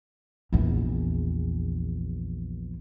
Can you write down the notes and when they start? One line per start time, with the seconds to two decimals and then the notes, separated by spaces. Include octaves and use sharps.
0.52 A#1 E2